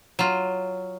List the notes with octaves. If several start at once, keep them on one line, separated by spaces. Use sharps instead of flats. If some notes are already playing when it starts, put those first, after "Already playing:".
F#3 F4